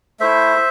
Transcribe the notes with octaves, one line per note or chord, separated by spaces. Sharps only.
A3 E4 C5 E5